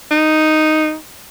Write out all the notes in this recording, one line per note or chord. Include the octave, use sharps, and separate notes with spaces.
D#4